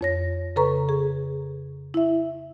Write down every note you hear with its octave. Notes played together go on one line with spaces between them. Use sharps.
F2 C#5 A#6
C#3 A4 B4 A#5 C#6
G#4
E4 E5